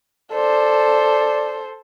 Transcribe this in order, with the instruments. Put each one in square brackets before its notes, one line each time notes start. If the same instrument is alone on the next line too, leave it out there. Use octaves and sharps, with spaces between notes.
[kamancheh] A4 C5 [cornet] D5